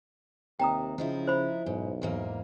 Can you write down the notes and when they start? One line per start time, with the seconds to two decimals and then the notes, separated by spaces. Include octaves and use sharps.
0.59 D#2 C3 G5 A#5 D#6
0.98 C#3 F3 D#4 E4
1.27 C5 B5
1.66 B1 G#2
2.02 E2 G#2 A#3